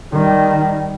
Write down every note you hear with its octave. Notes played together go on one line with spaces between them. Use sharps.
D#3 G3